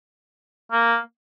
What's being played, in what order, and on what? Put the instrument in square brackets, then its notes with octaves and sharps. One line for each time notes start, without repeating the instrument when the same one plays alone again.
[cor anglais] A#3